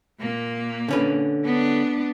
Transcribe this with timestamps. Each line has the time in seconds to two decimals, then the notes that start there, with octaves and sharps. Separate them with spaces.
0.20 A#2 A#3
0.88 D3 C#4 B4
1.45 B3 D4